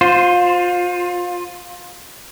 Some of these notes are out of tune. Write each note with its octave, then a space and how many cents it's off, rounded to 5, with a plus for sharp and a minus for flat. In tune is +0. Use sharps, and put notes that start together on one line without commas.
F4 +25 C5 +0